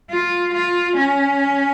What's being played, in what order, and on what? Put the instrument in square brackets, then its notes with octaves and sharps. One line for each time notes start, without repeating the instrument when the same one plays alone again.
[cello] F4
F4
C#4